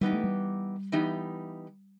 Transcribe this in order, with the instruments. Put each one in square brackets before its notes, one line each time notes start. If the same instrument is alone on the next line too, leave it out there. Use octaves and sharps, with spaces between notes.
[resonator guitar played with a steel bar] E3 B3 D#4 G4 [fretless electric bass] G3
[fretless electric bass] A3
G3
[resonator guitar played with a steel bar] E3 B3 D#4 G4